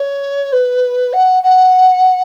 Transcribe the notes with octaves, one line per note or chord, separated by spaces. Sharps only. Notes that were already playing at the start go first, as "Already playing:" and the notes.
Already playing: C#5
B4
F#5
F#5